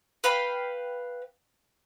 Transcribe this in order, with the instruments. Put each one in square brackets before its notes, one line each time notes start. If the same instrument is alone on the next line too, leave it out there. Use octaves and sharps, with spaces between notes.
[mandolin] B4 F5 G5 B5